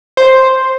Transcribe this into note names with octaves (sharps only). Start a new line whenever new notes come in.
C5